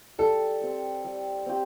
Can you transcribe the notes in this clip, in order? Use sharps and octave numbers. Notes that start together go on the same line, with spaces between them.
G3 A4
C4 G4
G3
C4 G4